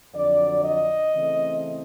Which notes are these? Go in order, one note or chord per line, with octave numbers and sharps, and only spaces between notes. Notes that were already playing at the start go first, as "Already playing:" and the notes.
F2 D3 F#3 D5
D#5
C#3 E3 A3 C4